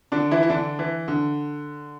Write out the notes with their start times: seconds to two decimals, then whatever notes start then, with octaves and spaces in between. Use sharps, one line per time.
0.12 D3 D4
0.31 E3 E4
0.43 E4
0.50 D3 D4
0.79 E3
1.08 D3